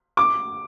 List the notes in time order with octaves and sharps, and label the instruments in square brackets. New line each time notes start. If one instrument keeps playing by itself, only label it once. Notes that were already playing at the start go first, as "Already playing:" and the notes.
[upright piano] D6